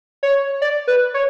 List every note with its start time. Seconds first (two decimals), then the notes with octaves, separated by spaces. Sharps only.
0.23 C#5
0.62 D5
0.88 B4
1.14 C#5